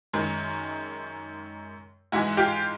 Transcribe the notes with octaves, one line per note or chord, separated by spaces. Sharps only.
F#2 D#3 G#3
G#2 E3 G#3 E4 F#4
F4 G4